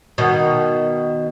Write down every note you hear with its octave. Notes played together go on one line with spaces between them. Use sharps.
B2 D#3